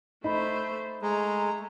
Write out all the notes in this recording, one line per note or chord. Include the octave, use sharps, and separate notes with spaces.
A3 D#4 C5 B5
G#3 A3 A#5